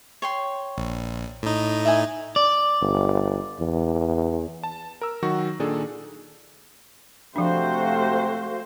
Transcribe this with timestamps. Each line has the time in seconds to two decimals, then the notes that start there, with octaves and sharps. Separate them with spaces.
0.22 C#5 G5 C6
0.78 A#1
1.43 A2 D#4
1.85 E5 F#5 G#5
2.36 D5
2.81 G1
3.60 E2
4.63 A5
5.01 A#4 E6
5.22 D#3 F#3 F#4 C#6 A#6
5.59 A#2 D#3 D4 G#4 A4
7.36 C3 F3 A3 D4 F#4 C5 F5